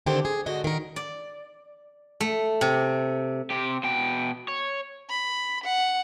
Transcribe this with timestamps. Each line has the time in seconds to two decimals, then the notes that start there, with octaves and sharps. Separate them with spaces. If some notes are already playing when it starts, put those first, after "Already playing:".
0.06 D3 D#3 C4 D4 G4 C5
0.25 G#4
0.46 G#2 D3 F#4 D#5
0.64 D#3 A#4
0.96 D5
2.20 A3
2.61 C3
3.50 C3 G4
3.83 B2 G5
4.48 C#5
5.10 B5
5.64 F#5